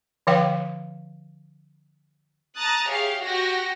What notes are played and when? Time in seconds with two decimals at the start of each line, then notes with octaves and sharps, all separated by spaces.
0.27 D3 F3 C#5 F5 G5
2.58 A5 A#5 D#6 F#6 A6
2.88 G4 G#4 C#5 E5 F5
3.22 F#4 G4 F#5 A#6